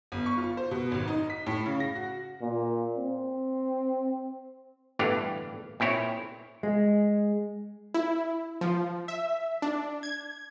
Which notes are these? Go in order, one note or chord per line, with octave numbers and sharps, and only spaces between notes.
G1
C#6
F4
C5
B2
G#1
D#4
B6
A2
C#3
A#6
F#4
A#2
C4
G1 A2 E3 D4 G4 F5
A#2 C4 E4 C#5
G#3
E4
F3
E5
D4
G#6